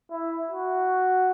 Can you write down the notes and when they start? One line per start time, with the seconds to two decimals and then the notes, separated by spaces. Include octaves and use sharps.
0.11 E4
0.50 F#4